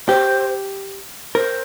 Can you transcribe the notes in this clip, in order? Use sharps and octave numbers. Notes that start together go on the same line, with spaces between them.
G4 C5
A#4 C5